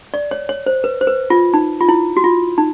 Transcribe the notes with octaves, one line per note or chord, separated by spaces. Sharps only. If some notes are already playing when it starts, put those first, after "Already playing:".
D5
C#5
C#5
C5
B4
C5
B4
F4
D#4
F4
E4
F#4
F4
D#4